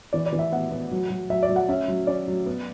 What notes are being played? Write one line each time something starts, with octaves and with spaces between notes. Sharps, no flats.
E3 D5
D5
E3
E5
B3 F#5
B3
F#3
F#3
F#3 E5
D5
F#3
F#5
C#4 E5
F#3
C#4 D5
F#3
B3